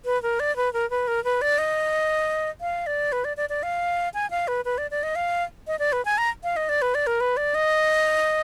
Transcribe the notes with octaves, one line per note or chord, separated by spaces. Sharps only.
B4
A#4
D5
B4
A#4
B4
A#4
B4
D5
D#5
F5
D5
B4
D5
D5
D5
F5
G#5
F5
B4
B4
D5
D5
D#5
F5
D#5
D5
B4
G#5
A#5
F5
D#5
D5
B4
D5
A#4
B4
D5
D#5